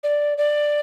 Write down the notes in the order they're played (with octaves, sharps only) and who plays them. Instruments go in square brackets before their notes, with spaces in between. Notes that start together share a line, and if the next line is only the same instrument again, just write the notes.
[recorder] D5
D5